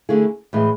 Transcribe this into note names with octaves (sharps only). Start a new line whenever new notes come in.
D3 A3 E4 G#4
A2 E3 G#3